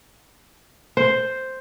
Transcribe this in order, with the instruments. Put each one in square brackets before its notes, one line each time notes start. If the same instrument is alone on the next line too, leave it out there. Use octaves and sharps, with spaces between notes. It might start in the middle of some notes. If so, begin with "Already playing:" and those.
[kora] C5